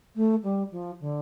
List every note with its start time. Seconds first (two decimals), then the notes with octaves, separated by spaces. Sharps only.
0.16 A3
0.43 G3
0.72 F3
1.01 D3